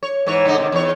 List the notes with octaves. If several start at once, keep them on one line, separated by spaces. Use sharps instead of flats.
C#5
G#2 E3 C#5
G#2 D3 D#4
C3 D#3
E2 C#5